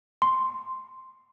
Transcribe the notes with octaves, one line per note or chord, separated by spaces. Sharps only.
C6